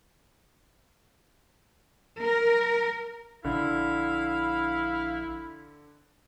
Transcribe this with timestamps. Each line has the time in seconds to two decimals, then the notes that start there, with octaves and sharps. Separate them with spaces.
2.22 A#4
3.45 A#1 D3 E4 F5